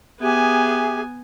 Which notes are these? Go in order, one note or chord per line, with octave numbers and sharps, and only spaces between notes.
B3 G4 G#4 E5 G#5